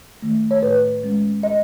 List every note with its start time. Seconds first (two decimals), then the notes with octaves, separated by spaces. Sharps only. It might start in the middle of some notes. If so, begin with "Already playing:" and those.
0.22 D#3 A3
0.51 C#5
0.63 A2 B4
1.03 G#3 C#4
1.43 D#5